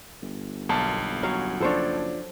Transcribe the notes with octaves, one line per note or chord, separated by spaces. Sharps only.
G1
B1 A#3 A5
F#3 C#4 F5
F#1 F3 D4 A4 C5 C#5